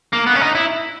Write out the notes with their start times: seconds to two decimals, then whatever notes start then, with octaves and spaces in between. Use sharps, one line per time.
0.13 A#3
0.26 B3
0.35 C#4
0.41 D#4
0.55 E4